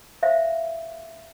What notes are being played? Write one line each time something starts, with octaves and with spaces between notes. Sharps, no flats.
C5 E5 F5